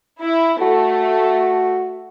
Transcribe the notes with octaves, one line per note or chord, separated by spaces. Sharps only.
E4
A3 F#4